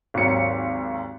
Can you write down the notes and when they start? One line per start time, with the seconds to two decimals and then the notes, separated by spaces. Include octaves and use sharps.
0.14 G#1 D#2 F#3 C#7